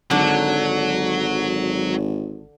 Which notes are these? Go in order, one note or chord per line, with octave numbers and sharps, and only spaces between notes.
G#1 D3 F#3 D4